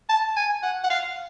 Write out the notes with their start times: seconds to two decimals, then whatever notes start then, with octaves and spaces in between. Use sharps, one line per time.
0.09 A5
0.37 G#5
0.63 F#5
0.84 F#5
0.90 F5